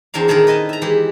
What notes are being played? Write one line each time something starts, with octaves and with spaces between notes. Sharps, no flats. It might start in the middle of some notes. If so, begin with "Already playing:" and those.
E2 C4 D4 A#4 F5
A#2 D#3 A3 E4 G#4 A#4
B4 D#5 G#5 A5
E5 A#5
E3 G#3 E4 G4